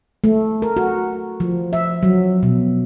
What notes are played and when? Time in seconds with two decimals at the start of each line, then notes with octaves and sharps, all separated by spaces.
0.24 A3
0.62 A#4
0.77 F#4
1.40 F3
1.73 E5
2.03 F#3
2.43 B2